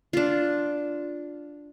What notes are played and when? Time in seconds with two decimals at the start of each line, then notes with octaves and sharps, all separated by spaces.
0.13 D4 F4